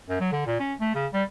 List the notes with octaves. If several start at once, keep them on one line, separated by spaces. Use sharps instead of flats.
F#2
F#3
D3
A#2
C#4
A3
C#3
G3